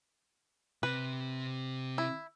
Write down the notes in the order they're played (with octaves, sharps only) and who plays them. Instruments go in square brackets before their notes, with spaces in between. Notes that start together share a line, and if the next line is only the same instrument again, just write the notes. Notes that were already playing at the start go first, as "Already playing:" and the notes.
[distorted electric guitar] C3 [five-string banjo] B4
[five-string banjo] E4